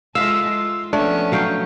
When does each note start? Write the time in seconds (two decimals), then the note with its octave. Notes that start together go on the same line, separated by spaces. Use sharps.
0.15 G#3 F4 A4 E5 F5 E6
0.49 F4
0.93 F3 A3 B3 C#4 D4
1.32 F#3 F5 G5